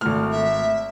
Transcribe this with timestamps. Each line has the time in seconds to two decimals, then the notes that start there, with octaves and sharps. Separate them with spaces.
0.01 G#1 A3 F6
0.31 E5